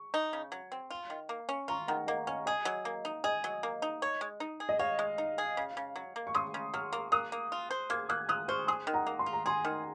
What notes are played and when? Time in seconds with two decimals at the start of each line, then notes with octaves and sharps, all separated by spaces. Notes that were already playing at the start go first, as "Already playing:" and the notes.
Already playing: C#6
0.14 D#4
0.33 C#3
0.52 F#3
0.72 C4
0.91 F4
1.10 D#3
1.29 A#3
1.49 C#4
1.68 F4 A#5 C#6
1.88 D#3 F#5 A#5
2.07 A#3 D#5 F#5
2.27 C#4 F5
2.46 G#4 D#5
2.65 F#3
2.85 A#3
3.05 D#4
3.24 G#4 D#5
3.44 F#3
3.63 A#3
3.82 D#4
4.02 C#5
4.21 G#3
4.40 D#4
4.60 G#4
4.69 D#5
4.79 C#5 F5
4.99 G#3
5.18 D#4
5.38 G#4
5.57 C#3
5.77 C#3
5.96 F#3
6.16 A#3
6.27 C#6
6.34 C#3 C6 D#6
6.54 C#3
6.74 F#3 C#6 F6
6.93 A#3
7.12 A#3 D#6 F#6
7.32 A#3
7.52 F4
7.71 C5
7.90 A#3 F6 G#6
8.09 A#3 D#6 F#6
8.29 F4 D#6 F#6
8.48 C5 C#6 F6
8.67 G#4 C6 D#6
8.87 D#3
8.93 F#5 A#5
9.07 A#3
9.19 C6
9.26 F4
9.33 A#5
9.46 G#4 G#5 C6
9.65 D#3